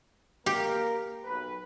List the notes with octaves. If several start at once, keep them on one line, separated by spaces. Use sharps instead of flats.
A#3 G4 A#4
B1 B4